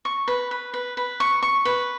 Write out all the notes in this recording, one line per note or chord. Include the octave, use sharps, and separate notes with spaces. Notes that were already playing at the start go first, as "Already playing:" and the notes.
C#6
B4
B4
B4
B4
C#6
C#6
B4